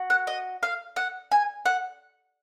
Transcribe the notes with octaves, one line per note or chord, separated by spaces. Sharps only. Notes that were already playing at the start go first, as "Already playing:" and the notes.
Already playing: F#4
F#5
D#5
F5
F#5
G#5
F#5